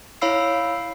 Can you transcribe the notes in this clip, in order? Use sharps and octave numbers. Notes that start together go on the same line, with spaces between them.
E4 C#5 F5 B5 E6 C7